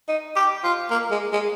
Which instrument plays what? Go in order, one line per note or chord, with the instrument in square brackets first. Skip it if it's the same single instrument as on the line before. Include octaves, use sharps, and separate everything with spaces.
[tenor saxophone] D#4
G4
F4
A#3
G#3
G#3